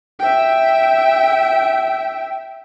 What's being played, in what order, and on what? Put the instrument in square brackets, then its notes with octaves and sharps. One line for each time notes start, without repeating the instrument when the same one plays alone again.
[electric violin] E5 G5